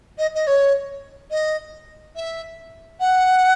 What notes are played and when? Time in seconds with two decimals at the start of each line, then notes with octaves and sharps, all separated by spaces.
0.18 D#5
0.35 D#5
0.47 C#5
1.30 D#5
2.16 E5
3.00 F#5